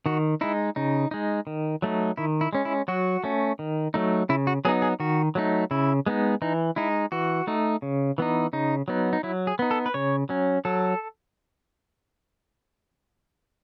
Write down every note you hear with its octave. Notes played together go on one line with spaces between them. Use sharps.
D#3 F#4
G#3 D#4 E4
C#3 D#4
G#3 D#4
D#3
F#3 A3 D#4
D#3 E4
E4
G#3 C#4
E4
F#3 F#4
A3 C#4
D#3
F#3 A3 D#4
C#3 E4
F#4
F#3 B3 D#4 G#4
G#4
D#3 F#4
F#3 A3 D#4
C#3 E4
G#3 B3 D#4
E3 D#4
G#3 D#4 E4
E3 F#4
A3 D#4
C#3
E3 B3 D#4
C#3 D#4
F#3 B3 D#4
D#4
F#3 E4
G#4
B3 D#4
A4
B4
C#3 C#5
F#3 C#4
F#3 A4